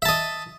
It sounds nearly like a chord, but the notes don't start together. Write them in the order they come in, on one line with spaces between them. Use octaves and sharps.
E5 A5 D#5